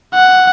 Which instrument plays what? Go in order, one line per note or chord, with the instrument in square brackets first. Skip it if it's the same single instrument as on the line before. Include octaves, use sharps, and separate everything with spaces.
[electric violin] F#5